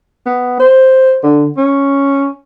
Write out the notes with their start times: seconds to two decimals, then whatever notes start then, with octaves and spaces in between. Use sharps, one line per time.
0.26 B3
0.60 C5
1.24 D3
1.57 C#4